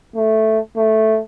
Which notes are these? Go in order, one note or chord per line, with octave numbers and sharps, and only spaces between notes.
A3
A3